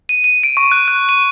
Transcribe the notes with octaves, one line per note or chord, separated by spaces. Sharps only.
D#7
D#7
D7
C#6
F#6
F#6
D#7